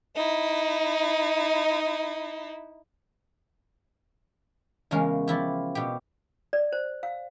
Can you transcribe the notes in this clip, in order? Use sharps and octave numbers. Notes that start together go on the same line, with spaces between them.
D#4 E4
E2 C#3 G#3 A#3 C#4
F3 E4 G4
B2 G4
D5
C5
F5